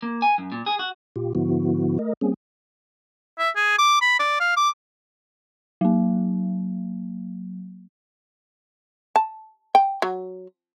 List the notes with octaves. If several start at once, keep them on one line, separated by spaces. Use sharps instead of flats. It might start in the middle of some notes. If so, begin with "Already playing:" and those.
A#3
G#5
F#2
A#2
G#4
F#4
A#2 F4 G4
G#2 D3 F3 B3 E4 F#4
A3 A#4 D#5
G3 A#3 C4 C#4 G#4
E5
G#4
D6
B5
D5
F5
D6
F#3 A#3
A5
G5
F#3